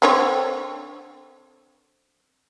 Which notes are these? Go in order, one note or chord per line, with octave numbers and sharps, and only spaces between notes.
D3 C4 C#5